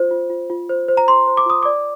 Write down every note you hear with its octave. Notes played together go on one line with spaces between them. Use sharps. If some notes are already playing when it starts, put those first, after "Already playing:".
Already playing: F4 C5
F4
F4
F4
C5
C5
A#5
C5 C6
C5
D6
F4 D#6
D5 D6